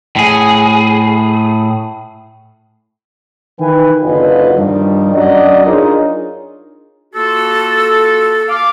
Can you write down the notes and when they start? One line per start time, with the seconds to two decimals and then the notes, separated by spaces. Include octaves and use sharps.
0.16 A2 G#4
3.59 D#3 E3 B4 G5 G#5
4.03 F#1 D3 F#3 F4 B4 D#5
4.57 G2 D#3 F3 G3
5.15 F#2 F#3 D4 D5 D#5
5.65 D4 D#4 F4 G#4 A#4 C#5
7.14 A#3 F4 F#4 A4
8.48 F5 D6